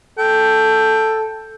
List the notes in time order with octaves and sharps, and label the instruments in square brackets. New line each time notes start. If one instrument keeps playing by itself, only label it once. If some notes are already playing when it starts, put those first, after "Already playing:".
[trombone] A4 [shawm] G5